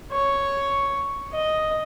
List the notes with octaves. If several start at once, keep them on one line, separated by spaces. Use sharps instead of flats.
C#5
D#5